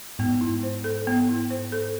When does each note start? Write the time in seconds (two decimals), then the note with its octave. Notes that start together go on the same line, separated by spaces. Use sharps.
0.19 G#2 B3
0.41 E4
0.63 C5
0.84 A4
1.07 B3
1.29 E4
1.50 C5
1.72 A4